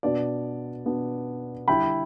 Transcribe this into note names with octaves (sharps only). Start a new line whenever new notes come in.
B2 B3 D4 D5
B2 B3 D4
D3 G3 E4 G5 B5